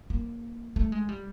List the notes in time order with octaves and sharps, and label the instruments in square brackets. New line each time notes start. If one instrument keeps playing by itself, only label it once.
[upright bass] A#3
A3
G#3
G3